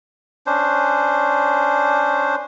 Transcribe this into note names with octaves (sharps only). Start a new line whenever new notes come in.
C#4 D4 C5